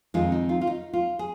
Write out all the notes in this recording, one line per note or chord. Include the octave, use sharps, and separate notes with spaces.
F2 D#3 G#3 D#4 F4
D#4
F4
F4
D#4
F4
G#4